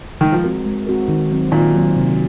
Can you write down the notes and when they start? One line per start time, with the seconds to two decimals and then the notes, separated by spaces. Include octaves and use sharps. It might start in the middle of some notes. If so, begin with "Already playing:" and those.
0.21 D#3 G#3
0.32 F3
0.44 C4 F#4 A#4
0.66 G#3
0.87 C4 F#4 A#4
1.08 D#3
1.31 F#3 C4
1.52 A#2 D#3
1.75 F#3 C4
1.97 C3